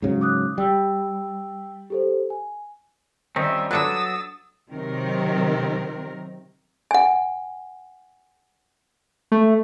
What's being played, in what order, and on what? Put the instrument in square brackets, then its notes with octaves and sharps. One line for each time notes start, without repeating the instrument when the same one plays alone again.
[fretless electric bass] G#2 C#3 F#3
[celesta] D6 D#6 F#6
[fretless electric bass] G3 [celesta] G5 E6
[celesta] G4 A4 C5
G#5
[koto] D#3 [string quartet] G3 F4 E5 [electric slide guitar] C4 C#4 D#4
[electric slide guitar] F#3 [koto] D4 A4 B4 [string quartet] D#6 E6 A6
[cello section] C3 D#3 F#3 C4 A#4
[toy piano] F#5 G#5
[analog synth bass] A3